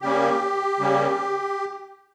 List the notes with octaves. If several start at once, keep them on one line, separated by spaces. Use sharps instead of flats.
C#3 G3 A#3 C#4 G4
C#3 G3 A#3 C#4